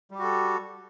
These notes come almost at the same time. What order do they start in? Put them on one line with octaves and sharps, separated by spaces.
G3 G4 F#4 A4